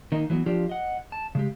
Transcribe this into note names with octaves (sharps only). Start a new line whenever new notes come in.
D#3 A#3 D#4
E3 F#3 G#3 B3
F3 D4 F4 G4
D#5 F#5
A5
C#3 G#3 G4